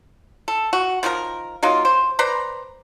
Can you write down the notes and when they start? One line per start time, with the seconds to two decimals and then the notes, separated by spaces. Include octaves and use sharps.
0.48 A4
0.73 F#4
1.03 D#3 F3 C#4 A#4
1.63 F#3 A#3 D#4 F4
1.85 C5
2.19 B4 C5 D5 A#5